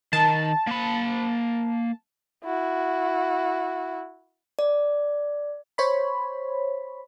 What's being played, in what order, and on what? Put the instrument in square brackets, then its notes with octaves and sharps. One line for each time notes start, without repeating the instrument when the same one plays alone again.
[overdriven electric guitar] D#3 [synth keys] A5
[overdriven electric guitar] A#3 B5
[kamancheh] E4 F#4
[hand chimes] D5
[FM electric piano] C5 C#5 B5